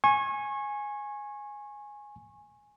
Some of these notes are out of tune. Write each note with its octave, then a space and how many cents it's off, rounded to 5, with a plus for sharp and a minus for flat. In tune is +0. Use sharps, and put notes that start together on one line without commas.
G#5 +0 C#6 -30